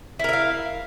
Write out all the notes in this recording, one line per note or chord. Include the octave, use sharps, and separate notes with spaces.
E4 A#4 E5 F5